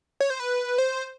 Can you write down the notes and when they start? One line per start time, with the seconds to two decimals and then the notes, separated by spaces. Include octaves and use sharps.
0.20 C#5
0.30 C5
0.40 B4
0.78 C5